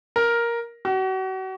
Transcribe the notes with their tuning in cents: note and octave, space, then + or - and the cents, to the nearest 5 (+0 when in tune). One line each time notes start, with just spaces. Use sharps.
A#4 +5
F#4 +35